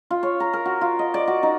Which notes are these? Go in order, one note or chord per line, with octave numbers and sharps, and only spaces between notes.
F4
C#5
A#5
A#4
F#4
F4
D#5
D5
F#4
D#4